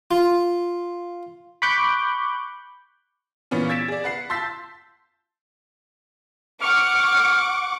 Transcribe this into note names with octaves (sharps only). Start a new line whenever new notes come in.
F4
B5 C#6 D6 F#6 G6
A#2 E3 B3 C#4 F4
E6 G#6 A6 B6 D7 E7
G#4 D5
B4 F#5 C7
A5 C6 E6 G6 A6 B6
F#5 C#6 D6 F6